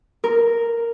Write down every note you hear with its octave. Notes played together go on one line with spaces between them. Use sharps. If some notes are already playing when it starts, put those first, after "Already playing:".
A#4